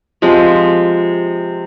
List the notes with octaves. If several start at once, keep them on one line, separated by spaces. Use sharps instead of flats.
C3 F3 G#3